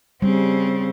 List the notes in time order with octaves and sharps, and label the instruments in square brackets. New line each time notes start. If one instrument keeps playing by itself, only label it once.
[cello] C#3 C4 [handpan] G3